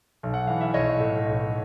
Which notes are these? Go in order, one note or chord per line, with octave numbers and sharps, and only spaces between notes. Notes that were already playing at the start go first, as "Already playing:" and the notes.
B1
F#5
E3 F5
E5
B1 C#5 D#5
A2
B1